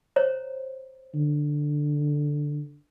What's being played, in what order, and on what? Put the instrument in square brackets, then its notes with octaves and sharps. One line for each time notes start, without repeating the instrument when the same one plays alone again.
[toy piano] C5 C#5 A#5
[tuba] D3